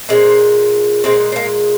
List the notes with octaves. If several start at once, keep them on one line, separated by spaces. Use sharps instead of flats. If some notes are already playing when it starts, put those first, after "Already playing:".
A#2 G#3 C4
A#2 G#3 C4
C4
A#3